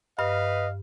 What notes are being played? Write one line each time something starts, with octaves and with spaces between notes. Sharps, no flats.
G2 B4 D#5 F5 F6